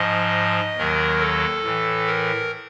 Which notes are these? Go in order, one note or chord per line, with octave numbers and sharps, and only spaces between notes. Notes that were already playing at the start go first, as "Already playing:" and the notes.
Already playing: G#2 F3 D#5
D#2 D#3 F#3 A#4
A4
A2 E3
A#4